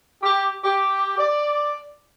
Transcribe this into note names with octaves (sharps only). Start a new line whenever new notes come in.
G4
G4
D5